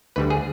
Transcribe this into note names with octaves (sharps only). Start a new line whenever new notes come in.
D2 D3 G3 B4
G#4